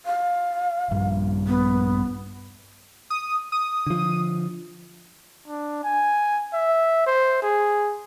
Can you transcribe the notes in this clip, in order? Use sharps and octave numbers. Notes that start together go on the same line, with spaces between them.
F5
A#1 G2 G3
B3
D#6
D#6
D3 F3
D4
G#5
E5
C5
G#4